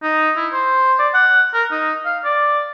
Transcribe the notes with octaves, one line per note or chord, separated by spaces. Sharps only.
D#4
E4
C5
D5
F#5
A#4
D#4
F5
D5